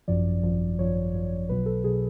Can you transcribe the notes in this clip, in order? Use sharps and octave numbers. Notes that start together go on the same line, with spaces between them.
G#1 F#2 F3 D5
G#1 F#2 F3
G#1 F#2 F3 C#5
G#1 F#2 F3
B1 B2 F#3 B4
A4
B1 B2 F#3 G#4